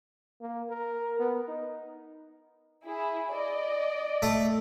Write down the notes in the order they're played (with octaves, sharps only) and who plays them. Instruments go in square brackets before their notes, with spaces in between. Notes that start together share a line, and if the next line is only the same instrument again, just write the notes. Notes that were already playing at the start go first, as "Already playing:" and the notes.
[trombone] A#3
A#4
B3
D#4
[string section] E4 G#4
D5 D#5
[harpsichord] A3 A4